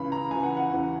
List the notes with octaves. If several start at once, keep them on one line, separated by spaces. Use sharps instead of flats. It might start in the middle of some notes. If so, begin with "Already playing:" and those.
Already playing: C#2 C#3 E3 B5
A#5
C#2 C#3 E3 G#5
F#5
F#5
E2 C#3 E3